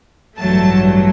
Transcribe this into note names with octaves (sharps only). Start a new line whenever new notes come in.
A1 G2 F#3 A3 A5